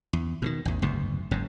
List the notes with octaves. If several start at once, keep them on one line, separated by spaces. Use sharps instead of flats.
E2
B2 D3 D#3
A1 E2
F#1 D2 G#2 B2
F#1 G#2 C#3